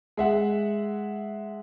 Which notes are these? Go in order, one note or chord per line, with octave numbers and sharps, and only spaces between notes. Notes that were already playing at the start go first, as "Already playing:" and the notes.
G#3 E5 F#5